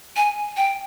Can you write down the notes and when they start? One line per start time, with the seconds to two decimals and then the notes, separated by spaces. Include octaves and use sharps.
0.17 G#5
0.57 G5